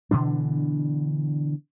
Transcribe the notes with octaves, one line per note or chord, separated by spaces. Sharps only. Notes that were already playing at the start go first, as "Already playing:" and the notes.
B2 D3 E3 D4